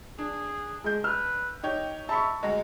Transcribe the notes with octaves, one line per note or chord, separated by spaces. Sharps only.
D4 G#4
G#3 G6
B4 E6 F6
D#4 G4 C#5 G5
E5 A5 B5 C#6
D2 G#3 A#5